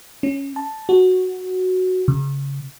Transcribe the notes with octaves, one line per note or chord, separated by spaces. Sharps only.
C#4
A5
F#4
C#3